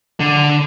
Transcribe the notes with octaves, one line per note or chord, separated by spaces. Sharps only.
D3